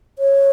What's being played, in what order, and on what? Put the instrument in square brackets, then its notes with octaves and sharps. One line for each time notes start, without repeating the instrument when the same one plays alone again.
[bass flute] C#5